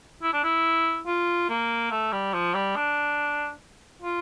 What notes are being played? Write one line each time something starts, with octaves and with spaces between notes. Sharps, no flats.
E4
D4
E4
F4
A#3
A3
G3
F3
G3
D4
F4